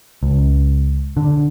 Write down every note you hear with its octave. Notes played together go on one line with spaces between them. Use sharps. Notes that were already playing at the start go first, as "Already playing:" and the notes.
C#2
D3